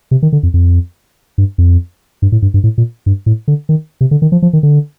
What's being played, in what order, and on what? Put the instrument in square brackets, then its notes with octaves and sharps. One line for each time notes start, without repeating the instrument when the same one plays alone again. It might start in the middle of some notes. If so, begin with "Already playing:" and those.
[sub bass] C3
D#3
D3
F2
F2
G2
F2
G2
A2
G2
G2
A2
A#2
G2
A2
D3
D#3
C3
D3
D#3
F3
F3
D#3
D3